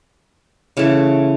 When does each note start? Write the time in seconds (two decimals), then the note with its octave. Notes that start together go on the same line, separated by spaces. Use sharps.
0.77 C#3 E3 A3